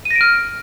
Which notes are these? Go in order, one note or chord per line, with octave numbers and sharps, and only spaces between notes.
D#7
A#6
D7
F6